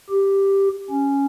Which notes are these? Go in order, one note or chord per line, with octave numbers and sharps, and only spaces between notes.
G4
C#4